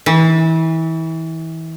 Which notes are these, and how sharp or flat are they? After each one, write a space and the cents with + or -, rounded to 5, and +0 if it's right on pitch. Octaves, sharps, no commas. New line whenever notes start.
E3 -30